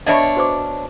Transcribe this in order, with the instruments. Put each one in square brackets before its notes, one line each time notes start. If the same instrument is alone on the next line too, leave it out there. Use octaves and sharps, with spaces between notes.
[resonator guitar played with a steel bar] B2 D4 C#5 [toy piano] D#5 E5 B5
[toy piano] F#4 C5 D6